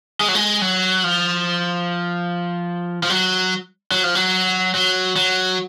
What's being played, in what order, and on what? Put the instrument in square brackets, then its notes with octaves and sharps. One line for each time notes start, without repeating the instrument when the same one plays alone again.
[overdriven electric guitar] G#3
F#3
G#3
F#3
F3
F3
F#3
F#3
F3
F#3
F#3
F#3